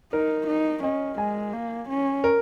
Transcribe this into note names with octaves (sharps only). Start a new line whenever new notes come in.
D#4 A#4
D#4
C#4 D#5
G#3 G#5
A#3
C#4
A#4